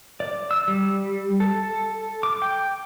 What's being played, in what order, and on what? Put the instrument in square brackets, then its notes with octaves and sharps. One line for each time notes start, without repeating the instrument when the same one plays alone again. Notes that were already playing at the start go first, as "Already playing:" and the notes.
[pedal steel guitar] D5
E6
G3
A4
D6
G5